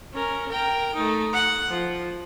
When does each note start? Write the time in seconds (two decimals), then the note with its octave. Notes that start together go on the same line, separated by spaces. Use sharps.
0.13 C#4 A#4
0.49 A#4 G5
0.95 A3 D#4
1.34 F#5
1.69 F3